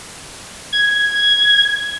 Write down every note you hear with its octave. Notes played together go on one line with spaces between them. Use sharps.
G#6